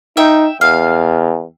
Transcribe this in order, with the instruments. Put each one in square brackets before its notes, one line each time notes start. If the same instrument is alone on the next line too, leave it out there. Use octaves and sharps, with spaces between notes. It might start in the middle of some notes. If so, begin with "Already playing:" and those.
[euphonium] D#4 [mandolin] E5 G5
[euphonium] E2 [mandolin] F5